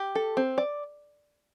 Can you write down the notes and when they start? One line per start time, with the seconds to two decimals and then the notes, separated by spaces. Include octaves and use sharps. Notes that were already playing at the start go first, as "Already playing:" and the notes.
Already playing: G4
0.15 A4
0.37 C4
0.58 D5